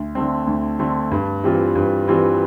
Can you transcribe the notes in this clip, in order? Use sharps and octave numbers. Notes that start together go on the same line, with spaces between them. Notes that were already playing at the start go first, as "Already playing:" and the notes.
Already playing: D2
D3 A3 C4
D2
D3 A3 C4
G2
E3 G3 C4 F4
G2
E3 G3 C4 F4